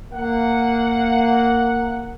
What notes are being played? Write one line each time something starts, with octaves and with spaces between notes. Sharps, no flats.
A#3 F#5